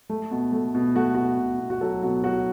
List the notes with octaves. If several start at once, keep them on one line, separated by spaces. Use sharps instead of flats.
A3
B2
A3
B2
A3 F#4
B2 F#4
B2
B2
F#4
F#3 A4
B2 F#4
F#3 F#4